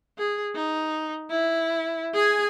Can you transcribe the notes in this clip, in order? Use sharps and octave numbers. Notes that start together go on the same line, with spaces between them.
G#4
D#4
E4
G#4 G#5